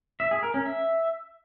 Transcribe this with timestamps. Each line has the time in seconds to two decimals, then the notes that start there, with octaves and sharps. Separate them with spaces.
0.20 E5
0.31 G#4
0.43 A#4
0.54 C#4
0.65 E5